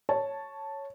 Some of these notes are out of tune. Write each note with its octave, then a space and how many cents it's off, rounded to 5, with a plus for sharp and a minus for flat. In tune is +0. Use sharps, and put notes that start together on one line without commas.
C#5 +0 A5 +0